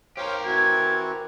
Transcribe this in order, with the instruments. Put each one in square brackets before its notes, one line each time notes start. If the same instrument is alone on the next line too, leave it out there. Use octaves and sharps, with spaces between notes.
[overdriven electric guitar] G4 A#4 [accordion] C5 C#5 F5
[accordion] E3 C4 F#4 [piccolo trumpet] G#6